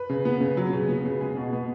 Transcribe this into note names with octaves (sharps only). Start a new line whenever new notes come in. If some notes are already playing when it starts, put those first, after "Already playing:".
Already playing: B4
C#3
B3
C#3
F#3
C#3
B3
C#3
G#3 G#4
B2
B3